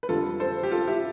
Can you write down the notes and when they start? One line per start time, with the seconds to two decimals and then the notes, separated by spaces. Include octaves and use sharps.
0.03 B4
0.09 F2 D3 G3 F4 A4
0.40 A4 C5
0.63 G4
0.71 F4 A4
0.87 E4 G4